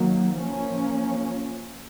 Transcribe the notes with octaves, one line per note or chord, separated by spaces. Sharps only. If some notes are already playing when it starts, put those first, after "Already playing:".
Already playing: D#3 F#3 A#3
F3 A#3 C#4